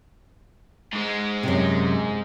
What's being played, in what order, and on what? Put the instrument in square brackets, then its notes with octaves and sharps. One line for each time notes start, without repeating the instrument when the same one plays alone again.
[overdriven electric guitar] G#2 G#3
[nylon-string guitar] F#2 C3